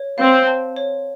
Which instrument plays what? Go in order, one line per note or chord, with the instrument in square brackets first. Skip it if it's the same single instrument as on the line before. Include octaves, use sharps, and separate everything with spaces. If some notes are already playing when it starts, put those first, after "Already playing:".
Already playing: [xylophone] C#5
[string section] C4 [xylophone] F5
[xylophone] A5
C#5